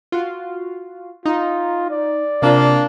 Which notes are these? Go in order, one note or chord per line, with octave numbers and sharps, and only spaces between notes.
F4 F#4
D#4 F4
D5
C3 A#3 D4 F4